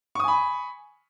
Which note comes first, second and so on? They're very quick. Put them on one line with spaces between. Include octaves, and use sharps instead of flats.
C#6 D#6 G#5 B5